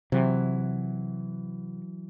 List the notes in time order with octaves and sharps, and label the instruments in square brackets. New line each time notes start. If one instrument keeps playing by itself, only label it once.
[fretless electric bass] C3 [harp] E3 F#3